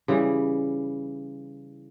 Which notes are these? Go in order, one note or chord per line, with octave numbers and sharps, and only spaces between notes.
C#3 E3 G3 E4